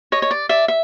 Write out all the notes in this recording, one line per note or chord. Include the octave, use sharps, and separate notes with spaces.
C#5 D#5
C#5
D5
D5 E5
E5